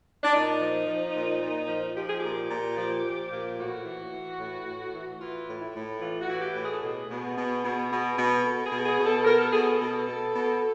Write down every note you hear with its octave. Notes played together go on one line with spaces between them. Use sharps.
D4
A#2 D#4
F3
F3
A#2
A#2
F3
F3 G4
G#4
A#2 G4
A#2
F3
F3
A#2
A2 F#4
E3
E3
A2
A2
E3
E3 F4
A2
E4
A2
E3 F4
F#4
E3
G4
A2
G#4
A4
B2 G#4
B2
B2
B2
B2
B2
B2 A4
G#4
B2
G#4
B2
A4
B2 A#4
A4
B2 G#4
A4
B2
B2
B2